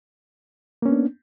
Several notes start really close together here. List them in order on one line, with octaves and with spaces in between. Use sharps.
A#3 C#4 B3 D4